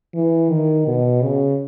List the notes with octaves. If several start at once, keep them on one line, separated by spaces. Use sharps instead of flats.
E3
D#3
B2
C#3